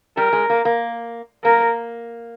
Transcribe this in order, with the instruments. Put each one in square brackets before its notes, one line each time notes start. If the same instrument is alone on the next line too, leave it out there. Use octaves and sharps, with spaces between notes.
[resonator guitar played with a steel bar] G3 [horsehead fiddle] A#4
[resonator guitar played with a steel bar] G#3
A#3
A#3
[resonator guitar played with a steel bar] A#3 [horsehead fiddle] A#4